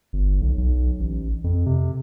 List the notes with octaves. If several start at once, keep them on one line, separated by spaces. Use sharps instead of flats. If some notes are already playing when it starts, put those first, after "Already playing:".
G1
B1
B1
A1
F2
C3